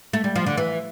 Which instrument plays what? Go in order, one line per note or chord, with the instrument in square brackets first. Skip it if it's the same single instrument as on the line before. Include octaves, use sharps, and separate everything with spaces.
[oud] A3
G3
F3
D3
E3